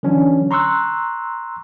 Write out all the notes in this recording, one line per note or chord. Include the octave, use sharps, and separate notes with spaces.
D3 E3 F#3 C#4 D4
A#5 C6 C#6 E6 F#6